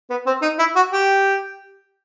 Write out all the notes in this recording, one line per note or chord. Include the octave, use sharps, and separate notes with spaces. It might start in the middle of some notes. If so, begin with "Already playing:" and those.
B3
C4
D#4
E4
F#4
G4